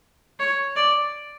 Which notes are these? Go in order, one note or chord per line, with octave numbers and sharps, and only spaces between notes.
C#5
D5